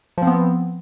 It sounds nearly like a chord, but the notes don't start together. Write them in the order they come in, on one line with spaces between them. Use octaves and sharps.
F3 C4 B3